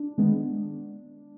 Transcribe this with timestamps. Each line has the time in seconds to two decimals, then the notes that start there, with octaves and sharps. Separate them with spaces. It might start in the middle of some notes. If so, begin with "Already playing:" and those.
Already playing: D4
0.18 D#3 G#3 B3